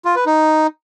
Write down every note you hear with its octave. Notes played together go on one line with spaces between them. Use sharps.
F4
B4
D#4